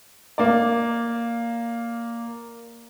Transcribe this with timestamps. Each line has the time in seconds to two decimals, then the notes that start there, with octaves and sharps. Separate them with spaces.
0.38 A#3 D5